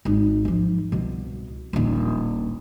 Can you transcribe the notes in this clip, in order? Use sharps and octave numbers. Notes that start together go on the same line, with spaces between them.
G#1 D#4
G#2 F3
C2 B2
D#1 A#1